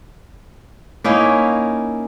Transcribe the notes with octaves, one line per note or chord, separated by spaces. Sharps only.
A#3 C#4 D#4 E4